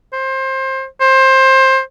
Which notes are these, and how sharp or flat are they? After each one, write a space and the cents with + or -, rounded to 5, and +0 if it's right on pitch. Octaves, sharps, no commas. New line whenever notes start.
C5 +25
C5 +20